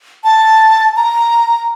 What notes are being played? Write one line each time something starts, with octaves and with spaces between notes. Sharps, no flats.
A5
A#5